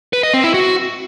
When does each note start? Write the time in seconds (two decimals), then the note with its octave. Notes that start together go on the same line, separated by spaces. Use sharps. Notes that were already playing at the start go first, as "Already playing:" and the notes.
0.13 B4
0.23 D#5
0.34 C4
0.44 E4
0.54 F#4